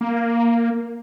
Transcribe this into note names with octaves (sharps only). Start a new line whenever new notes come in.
A#3